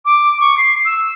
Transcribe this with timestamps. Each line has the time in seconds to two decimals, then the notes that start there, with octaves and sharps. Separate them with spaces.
0.05 D6
0.41 C#6
0.57 C7
0.85 E6